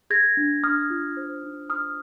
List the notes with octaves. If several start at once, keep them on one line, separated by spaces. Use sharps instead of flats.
G#4 G#6 A#6
D4
D4 D#6 F6
F4
C5
D#4
D#4 D#6 F6